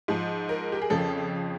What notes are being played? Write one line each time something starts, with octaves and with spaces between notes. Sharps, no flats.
G#2 F3
A#4
G4
G#4
F2 C#3 F3 A4